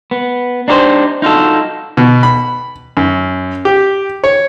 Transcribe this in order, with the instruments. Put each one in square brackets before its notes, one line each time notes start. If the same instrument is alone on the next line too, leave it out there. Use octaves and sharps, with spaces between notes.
[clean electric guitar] B3
D4 D#4 G4 A4 C5
D#4 F4 F#4 A4
[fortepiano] B2
B5
F#2
G4
C#5